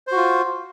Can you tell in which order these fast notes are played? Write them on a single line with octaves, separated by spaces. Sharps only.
C5 F#4 F4